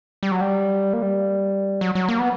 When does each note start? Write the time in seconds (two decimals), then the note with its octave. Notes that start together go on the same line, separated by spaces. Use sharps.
0.23 G3
0.31 F#3
0.41 G3
0.93 A#3
1.02 G3
1.81 F#3
1.95 F#3
2.09 A#3
2.19 B3